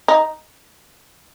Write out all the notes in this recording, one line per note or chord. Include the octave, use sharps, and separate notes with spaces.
D#4